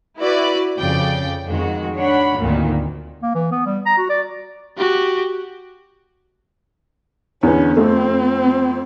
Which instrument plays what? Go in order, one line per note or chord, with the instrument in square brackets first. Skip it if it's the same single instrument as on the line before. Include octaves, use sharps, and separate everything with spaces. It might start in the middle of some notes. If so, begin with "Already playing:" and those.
[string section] E4 F#4 B4 D5
F2 C#3 D5 G5
F2 D#3 G#3 F#4
D4 C#5 F#5 B5
G#1 D2 A#2 D#3
[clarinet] A#3
E3
B3
G3
A#5
F#4
D5
[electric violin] F#4 G4
[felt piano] E2 D3 B3 [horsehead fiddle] C#4
[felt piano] F2 A3 [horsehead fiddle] C4